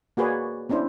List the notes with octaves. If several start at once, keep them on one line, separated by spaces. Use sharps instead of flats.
A#3 F#4 G#4 B4 C#5 D5
B3 C#4 D4 E4 C5